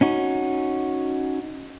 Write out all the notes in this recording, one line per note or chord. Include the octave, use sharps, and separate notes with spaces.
C#4 D#4 F#4